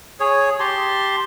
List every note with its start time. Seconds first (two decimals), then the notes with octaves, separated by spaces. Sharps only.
0.20 G#4 C#5
0.60 G4 A5 C6